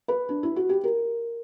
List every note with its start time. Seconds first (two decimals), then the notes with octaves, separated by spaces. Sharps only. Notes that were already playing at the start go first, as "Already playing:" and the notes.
0.08 B4
0.29 D4
0.43 E4
0.56 F#4
0.69 G4
0.84 A#4